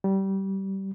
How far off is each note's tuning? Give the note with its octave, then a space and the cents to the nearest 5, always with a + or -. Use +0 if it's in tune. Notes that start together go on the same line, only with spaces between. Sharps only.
G3 -20